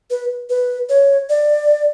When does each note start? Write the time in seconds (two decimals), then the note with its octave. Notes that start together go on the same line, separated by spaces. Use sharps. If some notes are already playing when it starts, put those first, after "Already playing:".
0.10 B4
0.50 B4
0.89 C#5
1.29 D5